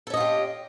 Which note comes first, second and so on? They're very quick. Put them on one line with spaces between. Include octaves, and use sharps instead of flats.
A4 C#4 D#5 F4 G4